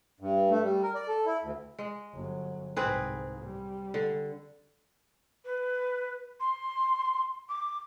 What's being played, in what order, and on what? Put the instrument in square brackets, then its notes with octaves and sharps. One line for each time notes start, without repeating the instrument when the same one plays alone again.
[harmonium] G2
A3
G3
A#4
D5
A4
E4
D2
[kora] G#3
[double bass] G1 F#3
[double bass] C2 G#2 [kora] C4 G#4 B4
[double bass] G3
[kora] D3
[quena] B4
C6
D6